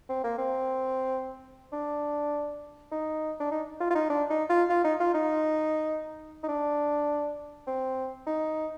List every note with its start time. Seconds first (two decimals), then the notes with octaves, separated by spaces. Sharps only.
0.09 C4
0.24 A#3
0.38 C4
1.73 D4
2.92 D#4
3.40 D4
3.51 D#4
3.80 F4
3.90 F4
3.95 D#4
4.10 D4
4.30 D#4
4.50 F4
4.70 F4
4.84 D#4
5.00 F4
5.15 D#4
6.43 D#4
6.48 D4
7.67 C4
8.27 D#4